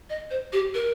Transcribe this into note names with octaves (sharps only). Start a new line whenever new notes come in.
D#5
C5
G4
A#4